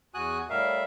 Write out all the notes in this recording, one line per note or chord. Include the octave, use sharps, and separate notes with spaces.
E2 F#4 G#5 D#6 F#6
A2 G3 A#4 E5 F5